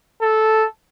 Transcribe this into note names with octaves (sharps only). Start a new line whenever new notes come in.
A4